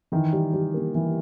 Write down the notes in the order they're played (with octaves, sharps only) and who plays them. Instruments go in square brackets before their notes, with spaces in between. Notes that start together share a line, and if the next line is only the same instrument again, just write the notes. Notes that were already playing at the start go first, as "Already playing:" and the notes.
[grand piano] D#3 [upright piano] E3
[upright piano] G3
G3
A#3
E3